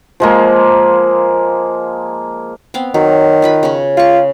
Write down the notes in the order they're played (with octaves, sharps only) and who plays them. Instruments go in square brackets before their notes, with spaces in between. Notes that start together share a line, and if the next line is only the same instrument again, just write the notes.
[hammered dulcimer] F3 G#3 A#3
[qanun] B3 C4 F5
[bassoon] D#3 [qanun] F#3
[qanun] F4 B4 B5
C#3 C#4
[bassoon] F4 [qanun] G#4 C#6